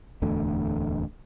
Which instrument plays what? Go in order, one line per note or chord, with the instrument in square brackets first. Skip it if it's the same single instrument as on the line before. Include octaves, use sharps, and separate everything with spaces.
[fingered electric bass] D1 E2 D3 A3